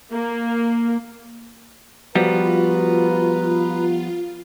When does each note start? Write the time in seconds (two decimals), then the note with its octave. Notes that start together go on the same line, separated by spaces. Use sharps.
0.11 A#3
2.15 F3 G3 B3 F4 F#4 B4 A#5